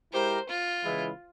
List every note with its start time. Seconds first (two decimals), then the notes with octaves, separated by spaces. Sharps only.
0.12 G#3 E4 G4 A#4 C5
0.49 F4
0.85 C#3 E3 G#3 E4